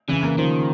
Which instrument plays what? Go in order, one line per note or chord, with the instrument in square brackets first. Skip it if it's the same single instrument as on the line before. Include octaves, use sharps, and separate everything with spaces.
[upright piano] C#3 [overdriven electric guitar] E3
[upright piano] A#3
[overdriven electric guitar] D#3 [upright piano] F3